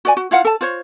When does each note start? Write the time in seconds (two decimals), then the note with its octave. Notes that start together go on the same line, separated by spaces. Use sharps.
0.05 F#4 D5 G#5
0.17 F#4
0.31 E4 F4 F5 F#5
0.45 A4 A5
0.61 F4 C5 C#5